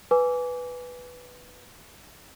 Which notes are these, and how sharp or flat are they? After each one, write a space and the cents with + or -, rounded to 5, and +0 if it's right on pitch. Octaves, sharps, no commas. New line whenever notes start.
B4 +0 G#5 +0 D6 -25